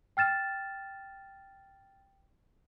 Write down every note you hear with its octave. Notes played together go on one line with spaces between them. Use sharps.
G5 F6 A6 E7